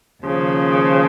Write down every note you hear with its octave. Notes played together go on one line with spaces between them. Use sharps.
D#2 C#3 F3